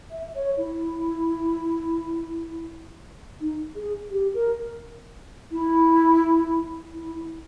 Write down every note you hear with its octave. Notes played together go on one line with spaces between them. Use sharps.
E5
C#5
E4
D#4
G#4
G4
A#4
E4
E4